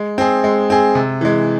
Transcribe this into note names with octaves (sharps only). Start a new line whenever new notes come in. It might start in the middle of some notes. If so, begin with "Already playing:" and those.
Already playing: G#3
C4 G#4
G#3
C4 G#4
C3
E3 G#3